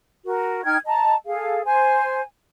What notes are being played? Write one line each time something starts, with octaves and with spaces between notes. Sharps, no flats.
F#4 A#4
D#4 G5 F6 G#6
D#5 A5 A#5
G#4 A4 F5
C5 G#5